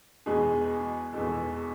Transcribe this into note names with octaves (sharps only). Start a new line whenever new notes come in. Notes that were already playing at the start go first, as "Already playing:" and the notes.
E2 B2 G#3 G#4
E2 B2 G#3 A4